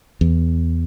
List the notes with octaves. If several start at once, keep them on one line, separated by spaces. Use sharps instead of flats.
E2